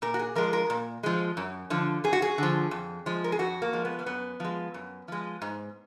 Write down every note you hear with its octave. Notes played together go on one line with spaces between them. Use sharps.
A#2 A#4
F#4
G#4
F3 G#3 A#4
A#4
A#2
F3 G#3
F#2
D3 F3
F#2 G#4
F#4
G#4
D3 F3
F2
F3 G#3
A#4
G#4
F2 F#4
A#3
F3 G#3
B3
A#3
F#2 B3
F3 G#3
F#2
F3 G#3
G#2